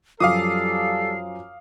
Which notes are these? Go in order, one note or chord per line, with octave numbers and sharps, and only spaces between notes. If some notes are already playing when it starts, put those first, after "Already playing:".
F#2 F3 G3 A4 F5 D6 D#6 C7